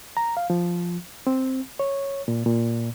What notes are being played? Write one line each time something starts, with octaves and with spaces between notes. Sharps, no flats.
A#5
F5
F3
C4
C#5
A#2
A#2